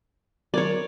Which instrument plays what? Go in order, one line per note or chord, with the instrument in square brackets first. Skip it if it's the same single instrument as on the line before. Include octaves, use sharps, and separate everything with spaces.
[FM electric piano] F#3 A#4 G#6 [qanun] C#5 D5